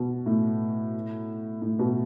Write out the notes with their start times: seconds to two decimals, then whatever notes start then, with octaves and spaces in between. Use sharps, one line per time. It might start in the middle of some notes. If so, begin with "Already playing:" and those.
Already playing: B2
0.26 A2
1.62 A2
1.79 B2